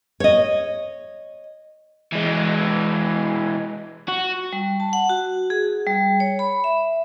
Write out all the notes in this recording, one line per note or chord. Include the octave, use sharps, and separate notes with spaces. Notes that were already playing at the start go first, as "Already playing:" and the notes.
C#5 D#5
E3 G#3
F#4
G3
A5
F#5
F#4
G#4
G3
C#5
B5
E5